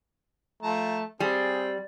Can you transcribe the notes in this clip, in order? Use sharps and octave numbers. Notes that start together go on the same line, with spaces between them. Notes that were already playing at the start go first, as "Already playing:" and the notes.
F3 A3 A5 A#5
G3 C4 G#4